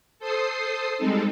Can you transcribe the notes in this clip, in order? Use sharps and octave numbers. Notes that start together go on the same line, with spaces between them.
A4 C5 D#6 C7
G3 G#3 C4 D#4 A4